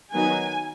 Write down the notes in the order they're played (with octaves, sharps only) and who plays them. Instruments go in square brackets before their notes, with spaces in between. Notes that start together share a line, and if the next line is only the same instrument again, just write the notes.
[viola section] D#3 F#3 B3 D#4 G#5